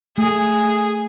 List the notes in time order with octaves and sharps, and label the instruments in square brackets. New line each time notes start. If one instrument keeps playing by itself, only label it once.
[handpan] A3 [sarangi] G#4